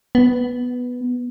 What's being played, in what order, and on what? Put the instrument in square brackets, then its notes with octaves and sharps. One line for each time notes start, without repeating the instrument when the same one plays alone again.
[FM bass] B3